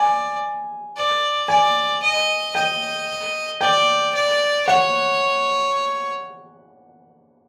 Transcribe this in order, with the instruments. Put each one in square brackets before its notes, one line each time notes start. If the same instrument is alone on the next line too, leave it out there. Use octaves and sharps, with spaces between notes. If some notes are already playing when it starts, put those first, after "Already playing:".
Already playing: [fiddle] D5 [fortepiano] G#5
[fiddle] D5
[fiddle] D5 [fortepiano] G#5
[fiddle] D#5
[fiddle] D#5 [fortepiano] G5
[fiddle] D5 [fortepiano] G5
[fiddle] D5
[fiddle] C#5 [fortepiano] F#5